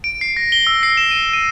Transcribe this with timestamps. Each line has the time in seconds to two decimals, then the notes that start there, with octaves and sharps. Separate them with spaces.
0.04 D7
0.21 C7
0.37 A#6
0.52 G7
0.67 E6
0.83 C7
0.97 E7
1.11 D#7
1.33 D#7